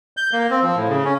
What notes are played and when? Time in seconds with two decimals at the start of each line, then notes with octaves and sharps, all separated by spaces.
0.17 G6
0.33 A#3
0.50 C4
0.62 F3
0.76 A2
0.89 C#3
1.05 C#4